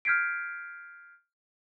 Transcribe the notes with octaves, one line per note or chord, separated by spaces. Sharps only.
F6 G6 G#6 B6 C7 D7